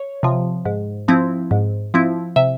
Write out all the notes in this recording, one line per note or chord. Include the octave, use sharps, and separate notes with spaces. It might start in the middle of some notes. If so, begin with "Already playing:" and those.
Already playing: C#5
C3 F3
G#2
F3 C4 E4
G#2
F3 C4 E4
C3 E5